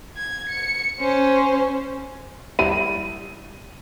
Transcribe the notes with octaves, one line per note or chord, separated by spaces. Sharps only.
G#6
C#7
C#4 C5
G3 E4 D#7